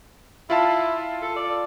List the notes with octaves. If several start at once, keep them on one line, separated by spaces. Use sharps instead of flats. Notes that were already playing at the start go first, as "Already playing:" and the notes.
E4 F4 F5 A5
A4
D5